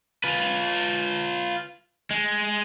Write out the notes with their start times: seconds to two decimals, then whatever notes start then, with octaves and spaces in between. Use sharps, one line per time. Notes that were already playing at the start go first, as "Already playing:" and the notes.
0.24 F4 B4
2.11 G#3